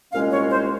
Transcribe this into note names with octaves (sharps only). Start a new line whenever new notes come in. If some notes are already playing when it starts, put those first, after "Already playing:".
C2 A#2 G#3 C#4 F5
C#5
C5